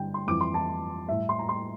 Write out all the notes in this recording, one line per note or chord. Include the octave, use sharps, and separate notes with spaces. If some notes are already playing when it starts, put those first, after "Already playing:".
Already playing: G2 D3 G3 G5
C6
F2 E3 G3 D6
C6
A5
A2 G3 E5
C6
A#5
C6